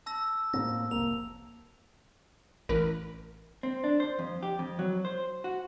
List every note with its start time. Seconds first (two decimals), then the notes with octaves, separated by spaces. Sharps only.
0.06 A5 E6 A#6
0.54 A2 A#3 C4 A#6
0.91 F1 C2 A#3 F7
2.69 A1 A#4 B4 F6
3.63 C4
3.84 D4
4.00 C5
4.19 F2
4.43 G4
4.59 F2
4.79 F#3
5.05 C5
5.44 F#4